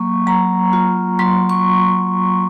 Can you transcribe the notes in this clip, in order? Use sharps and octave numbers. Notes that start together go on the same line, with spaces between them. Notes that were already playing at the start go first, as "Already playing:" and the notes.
Already playing: F#3 A#3 C#6
F#3 A#5
F4
F#3 C6
C#6